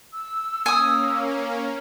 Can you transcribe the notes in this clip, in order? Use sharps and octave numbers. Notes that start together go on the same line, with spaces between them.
E6
A#3 C#4 G#5 D#6